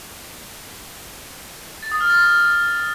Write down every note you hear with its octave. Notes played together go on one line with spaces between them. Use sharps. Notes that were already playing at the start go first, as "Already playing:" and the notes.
A6
D#6
F6
A6